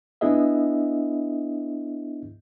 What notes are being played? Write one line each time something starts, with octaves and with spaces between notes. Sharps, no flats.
B3 D4 E4 G#4 D#5 E5